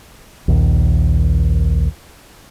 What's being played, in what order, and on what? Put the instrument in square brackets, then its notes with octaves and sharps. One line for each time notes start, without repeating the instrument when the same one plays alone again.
[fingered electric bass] A#1 D#2